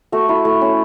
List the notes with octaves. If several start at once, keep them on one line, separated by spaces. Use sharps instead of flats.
A3 F#4
E4
A3
C#4